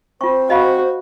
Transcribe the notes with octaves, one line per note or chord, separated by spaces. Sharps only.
C4 F4 C5 C#6
F#4 D#5 F5 B5